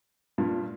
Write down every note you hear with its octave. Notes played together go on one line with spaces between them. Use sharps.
G2 A#2